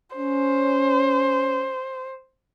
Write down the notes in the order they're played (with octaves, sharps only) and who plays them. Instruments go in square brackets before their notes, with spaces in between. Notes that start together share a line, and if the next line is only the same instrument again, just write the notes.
[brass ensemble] C#4 [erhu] C5